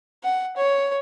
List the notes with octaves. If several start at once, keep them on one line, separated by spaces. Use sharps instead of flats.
F#5
C#5